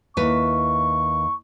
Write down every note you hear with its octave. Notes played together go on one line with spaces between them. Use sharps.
D#2 E4 B4 C#6